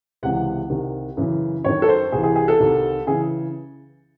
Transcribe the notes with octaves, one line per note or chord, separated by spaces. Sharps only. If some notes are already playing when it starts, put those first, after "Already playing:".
C#2 C3 E3 F#5
C2 C3 D#3
F#2 C#3 E3
F#2 D#3 C#5
A4
C5
C2 C3 E3 G#4
G#4
G#4
A4
C2 C3 D#3
C#3 E3 G#4